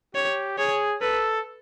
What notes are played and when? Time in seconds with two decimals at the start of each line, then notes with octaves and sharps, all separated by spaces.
0.15 G4 C#5
0.58 G#4 C#5
1.02 A4 B4